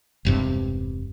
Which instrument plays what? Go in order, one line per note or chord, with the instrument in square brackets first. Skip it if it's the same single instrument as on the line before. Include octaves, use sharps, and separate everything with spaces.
[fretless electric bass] E1 G2 C3